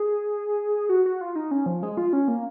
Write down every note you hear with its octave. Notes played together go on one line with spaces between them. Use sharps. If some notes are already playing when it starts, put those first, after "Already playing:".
Already playing: G#4
F#4
F#4
F4
D#4
C#4
F3
G#3
F4
C#4
A#3